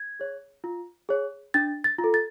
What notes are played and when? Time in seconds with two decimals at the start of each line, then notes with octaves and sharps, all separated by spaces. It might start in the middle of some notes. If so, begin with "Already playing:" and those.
Already playing: G#6
0.20 G#4 C#5
0.64 F4
1.09 G#4 C#5
1.54 D4 A6
1.84 A6
1.99 F4
2.04 A4
2.14 A6